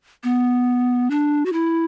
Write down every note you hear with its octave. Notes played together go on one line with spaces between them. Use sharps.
B3
D4
F#4
E4